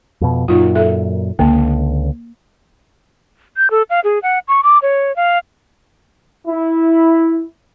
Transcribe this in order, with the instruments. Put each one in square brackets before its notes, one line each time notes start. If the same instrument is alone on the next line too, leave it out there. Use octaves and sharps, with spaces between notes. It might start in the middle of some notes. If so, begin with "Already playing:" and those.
[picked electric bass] F2 B2
[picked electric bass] F#2 A#2 [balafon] D#4 F4
[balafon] A4 E5
[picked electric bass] C#2 D3 [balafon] A#3
[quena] G6
A4
F5
G#4
F#5
C#6
D6
C#5
F5
[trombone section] E4